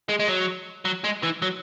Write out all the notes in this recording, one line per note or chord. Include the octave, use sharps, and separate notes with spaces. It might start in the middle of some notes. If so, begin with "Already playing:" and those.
G#3
G#3
F#3
F#3
G#3
E3
F#3